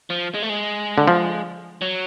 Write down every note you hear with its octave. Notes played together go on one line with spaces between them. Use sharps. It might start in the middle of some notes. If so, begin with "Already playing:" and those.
F3
G#3
A3
G#3
D3
F3
F#3